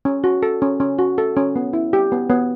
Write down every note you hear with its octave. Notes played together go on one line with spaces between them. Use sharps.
C#4
F#4
A4
C#4
C#4
F#4
A4
C#4
B3
E4
G4
B3
B3